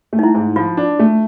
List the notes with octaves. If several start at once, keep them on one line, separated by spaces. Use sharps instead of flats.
A3
D#4
E4
G#2
F3 F4
D4
A3